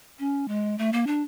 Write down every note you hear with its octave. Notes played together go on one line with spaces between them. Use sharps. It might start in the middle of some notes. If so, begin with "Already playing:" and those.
C#4
G#3
A3
A#3
D4